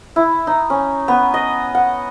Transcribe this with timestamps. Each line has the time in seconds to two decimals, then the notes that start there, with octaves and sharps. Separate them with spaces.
0.16 E4
0.47 D#4
0.70 C#4
1.08 B3
1.34 D#5
1.75 F#5